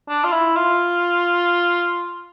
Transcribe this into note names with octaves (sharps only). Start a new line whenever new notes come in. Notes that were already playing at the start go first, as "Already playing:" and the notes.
D4
F4
E4
F4